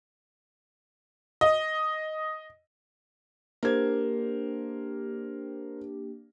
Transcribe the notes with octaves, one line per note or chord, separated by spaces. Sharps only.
D#5
A#3 D4 G4 A#4 C5 G#6